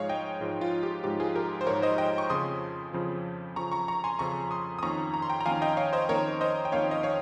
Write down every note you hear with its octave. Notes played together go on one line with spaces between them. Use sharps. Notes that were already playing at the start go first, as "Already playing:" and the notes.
Already playing: G#2 F3 G#3 G#4 C#5 F5
D#5 G5
G#2 F3 G#3
F4
G4
G#2 F3 G#3 G4
F4 G#4
G4 A#4
C5
G#2 F3 G#3 A#4 C#5
C5 D#5
D#5 G5
C#6
F2 C#3 F3 C6 D#6
F2 C#3 F3
F2 C#3 F3 A#5 C#6
A#5 C#6
A#5 C#6
G#5 C6
F2 C#3 F3 A#5 C#6
C6 D#6
D#6
F2 D#3 A#3 C#4 A#5 C#6
A#5
C6
G5 A#5
A#5
F2 D#3 A#3 C#4 F5 G#5
D#5 G5
C#5 F5
C5 D#5
F2 D#3 A#3 C#4 A#4 C#5
C5 D#5
G5
F2 D#3 A#3 C#4 C#5 F5
D#5
C#5 F5